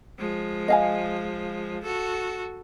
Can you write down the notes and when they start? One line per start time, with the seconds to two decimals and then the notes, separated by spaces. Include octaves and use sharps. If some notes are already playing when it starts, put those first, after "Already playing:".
0.18 F3 G#3
0.68 D#5 F5 G#5
1.84 F#4 A4